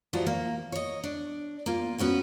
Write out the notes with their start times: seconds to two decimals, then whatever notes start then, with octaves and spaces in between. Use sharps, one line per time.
0.13 E3 F3 G3 D#4 F4 F#4
0.26 A#3
0.72 C#5 D#5
1.04 D4
1.66 A#3 F4
1.98 B3 C#4 F#4 G5